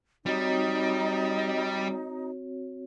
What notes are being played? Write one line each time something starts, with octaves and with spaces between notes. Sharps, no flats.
G3 C4 D#4 F#4 C#5